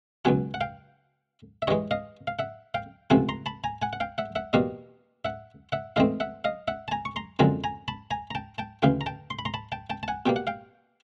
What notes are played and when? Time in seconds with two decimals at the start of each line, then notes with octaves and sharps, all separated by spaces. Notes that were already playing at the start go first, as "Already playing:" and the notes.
0.25 C#2 B2 F#3 F#5 G#5
0.54 F#5
0.61 F5 G5
1.62 E5
1.67 G2 E3 G#3 C#5 D#5
1.91 D#5 F5
2.27 F5
2.39 E5 F#5
2.74 F5 G5
3.10 C#2 C3 F3 A3 C4 F#5 G#5
3.29 A#5 C6
3.46 A5 B5
3.64 G#5 A#5
3.82 F#5 G#5
3.93 F#5
4.00 F5 G5
4.18 E5 F#5
4.35 E5 F#5
4.53 E2 B2 G3 A#3 D#5 F5
5.25 E5 F#5
5.72 E5 F#5
5.96 G#2 E3 A3 C4 D#5 F5
6.20 E5 F#5
6.44 D#5 F5
6.68 E5 F#5
6.88 A5
6.91 G#5 A#5
7.05 C#6
7.16 A#5 C6
7.39 F#2 D3 F3 G#3 C4 G#5 A#5
7.64 G#5 A#5
7.88 A5 B5
8.11 G#5 A#5
8.31 A#5
8.35 G5 A5
8.58 G5 A5
8.82 D2 C#3 E3 F5 G5
9.01 A#5
9.06 G5 A5
9.30 C6
9.39 B5
9.45 A#5 C6
9.54 A5 B5
9.72 G5 A5
9.90 G5 A5
10.03 A5
10.08 F#5 G#5
10.26 B2 G3 A#3 G5
10.36 F#5
10.47 F5 G5